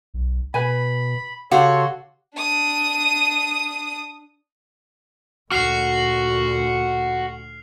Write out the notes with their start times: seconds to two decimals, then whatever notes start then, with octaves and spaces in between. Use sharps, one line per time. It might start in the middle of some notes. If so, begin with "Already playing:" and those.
0.14 B1
0.54 B2 B4 G#5 B5
1.51 C#3 F#4 G4 A4 C#5 F5 F#5 C6
2.37 D4 D#6
5.52 D2 A#2 F#4 F6 C7 F7